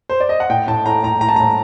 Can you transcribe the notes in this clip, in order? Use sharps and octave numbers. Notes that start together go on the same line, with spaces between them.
C5
D5
D#5
F#5
A2 G5
A2 A5
A2 A#5
A2 A#5
A2 A#5
A5
A2 A#5